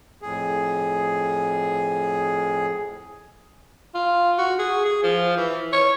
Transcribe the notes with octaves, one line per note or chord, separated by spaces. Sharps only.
F2 A2 G#4
F4
F#4
G#4
G#4
F3
E3
C#5